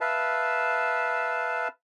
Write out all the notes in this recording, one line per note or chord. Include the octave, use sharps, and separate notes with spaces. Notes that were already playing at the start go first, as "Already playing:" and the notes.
B4 E5 F5 A5